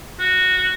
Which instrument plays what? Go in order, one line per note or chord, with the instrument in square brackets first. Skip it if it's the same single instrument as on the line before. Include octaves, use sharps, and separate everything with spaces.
[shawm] F#4